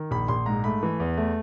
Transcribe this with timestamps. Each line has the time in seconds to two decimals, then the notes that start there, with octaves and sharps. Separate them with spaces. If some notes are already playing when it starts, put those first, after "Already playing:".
Already playing: D#3
0.11 A#1 B5
0.28 A#1 C6
0.46 G#2 A#5
0.64 A3 B5
0.83 E3
1.00 E2
1.17 A3